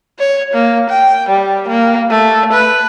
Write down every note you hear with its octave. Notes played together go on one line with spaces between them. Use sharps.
C#5
A#3
G5
G3
A#3
A3
B4